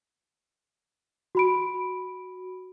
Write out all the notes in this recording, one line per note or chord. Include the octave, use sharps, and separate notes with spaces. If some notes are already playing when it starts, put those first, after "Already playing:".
F#4 B5 D7